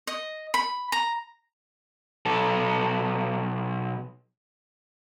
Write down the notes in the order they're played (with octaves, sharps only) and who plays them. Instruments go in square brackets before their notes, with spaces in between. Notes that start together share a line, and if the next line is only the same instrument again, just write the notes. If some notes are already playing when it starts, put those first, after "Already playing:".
[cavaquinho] D#5
B5
A#5
[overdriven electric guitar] B1 A4